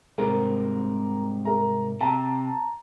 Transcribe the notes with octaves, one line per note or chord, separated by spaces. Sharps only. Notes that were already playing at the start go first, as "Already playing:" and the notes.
C2 G#2 C3 A#4 C5
A#4 E5 A#5
C3 A5 A#5